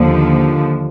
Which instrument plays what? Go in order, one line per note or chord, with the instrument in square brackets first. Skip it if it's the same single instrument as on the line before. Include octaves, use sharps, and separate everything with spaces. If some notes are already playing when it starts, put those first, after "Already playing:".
Already playing: [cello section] D#2 D3 F3